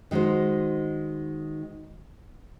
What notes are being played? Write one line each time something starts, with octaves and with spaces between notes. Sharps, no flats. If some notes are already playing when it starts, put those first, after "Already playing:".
D#3 G#3 D#4 F#4 C5